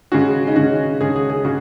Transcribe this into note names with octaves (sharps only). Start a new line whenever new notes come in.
C#3 G#3 C#4 F#4
D#4
C#3 G#3 C#4 F#4
C#3 G#3 C#4 G#4
G#4
G#4
C#3 F#4